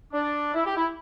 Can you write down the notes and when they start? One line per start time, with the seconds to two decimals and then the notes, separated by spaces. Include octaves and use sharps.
0.13 D4
0.55 E4
0.66 G4
0.76 E4